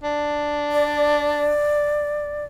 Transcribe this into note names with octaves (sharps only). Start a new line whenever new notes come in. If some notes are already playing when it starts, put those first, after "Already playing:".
D4
D5